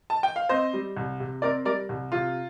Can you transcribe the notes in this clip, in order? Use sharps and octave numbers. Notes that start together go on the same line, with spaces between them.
A5
G5
F5
C4 C5 D#5
G3
C2
C3
C4 A#4 D5
G3 A#4 D5
C2
C3 F4